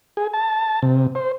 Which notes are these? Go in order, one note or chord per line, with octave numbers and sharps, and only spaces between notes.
G#4
A5
C3
C5